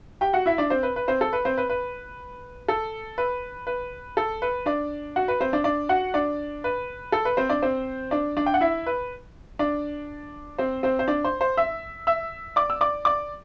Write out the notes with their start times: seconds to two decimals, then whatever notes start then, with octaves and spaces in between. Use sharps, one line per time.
0.21 G4 G5
0.33 F#4 F#5
0.46 E4 E5
0.58 D4 D5
0.70 C4 C5
0.83 B4
0.96 B4
1.08 C4 C5
1.21 A4
1.33 B4
1.45 C4 C5
1.58 B4
1.70 B4
2.68 A4
3.18 B4
3.67 B4
4.17 A4
4.42 B4
4.66 D4 D5
5.16 F#4 F#5
5.28 B4
5.40 C4 C5
5.53 D4 D5
5.64 D4 D5
5.89 F#4 F#5
6.14 D4 D5
6.64 B4
7.12 A4
7.25 B4
7.37 C4 C5
7.49 D4 D5
7.62 C4 C5
8.11 D4 D5
8.37 D4 D5
8.46 G5
8.54 F#5
8.61 E4 E5
8.86 B4
9.59 D4 D5
10.58 C4 C5
10.83 C4 C5
10.99 C5
11.08 D4 D5
11.24 C5 C6
11.41 C5 C6
11.57 E5 E6
12.07 E5 E6
12.56 D5 D6
12.70 E6
12.81 D5 D6
13.05 D5 D6